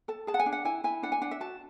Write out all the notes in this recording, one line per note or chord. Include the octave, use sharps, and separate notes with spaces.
A4 A5
G#4 A5
F#5
G#5
D4
F#5
E4 G#5
E4 G#5
D4 F#5
G#5
D4 F#5
E5
F#4 A5